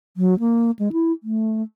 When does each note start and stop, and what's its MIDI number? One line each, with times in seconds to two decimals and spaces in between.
0.17 0.38 54
0.39 0.71 58
0.79 0.92 56
0.92 1.12 64
1.23 1.62 57